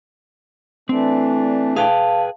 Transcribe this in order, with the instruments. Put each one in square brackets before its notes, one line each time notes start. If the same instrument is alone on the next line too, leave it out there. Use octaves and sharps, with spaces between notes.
[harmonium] E3 A3 D4 [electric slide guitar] C4
[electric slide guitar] G#4 B4 G5 [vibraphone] F5 A5